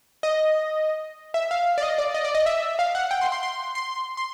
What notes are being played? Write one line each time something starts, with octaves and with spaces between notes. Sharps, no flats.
D#5
E5
F5
D5
D#5
D5
D#5
D5
D#5
E5
F5
F#5
G5
C6
C6
C6
C6
C6